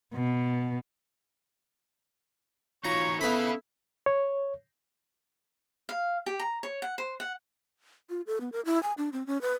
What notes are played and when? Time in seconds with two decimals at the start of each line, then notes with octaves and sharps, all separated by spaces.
0.14 B2
2.84 E3 D#4 F4 F#4 C#5 A#5
3.21 B3 C#4 E4 G#4 A4 F5 B5
4.06 C#5
5.89 F5
6.26 G4
6.40 A#5
6.63 C#5
6.82 F#5
6.98 C5
7.20 F#5
8.10 F4
8.27 A4
8.41 B3
8.52 A#4
8.65 E4
8.83 G#5
8.98 D4
9.13 C4
9.27 C#4
9.41 B4